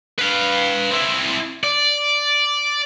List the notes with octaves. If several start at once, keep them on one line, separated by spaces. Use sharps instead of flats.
B4 F5
C4 E4
D5